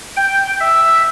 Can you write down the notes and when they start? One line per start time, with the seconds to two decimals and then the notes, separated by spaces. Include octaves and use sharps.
0.17 G5
0.60 E5